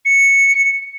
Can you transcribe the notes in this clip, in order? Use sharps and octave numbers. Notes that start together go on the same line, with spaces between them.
C#7